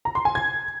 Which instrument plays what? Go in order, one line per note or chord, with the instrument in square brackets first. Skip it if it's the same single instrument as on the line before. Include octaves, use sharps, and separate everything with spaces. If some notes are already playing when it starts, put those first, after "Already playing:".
[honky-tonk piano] A#5
C6
G#5
G#6